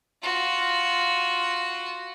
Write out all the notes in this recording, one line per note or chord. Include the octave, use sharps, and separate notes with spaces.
F4 F#4